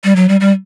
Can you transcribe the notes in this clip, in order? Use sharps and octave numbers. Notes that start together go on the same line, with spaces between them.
G3
F#3
G3
G3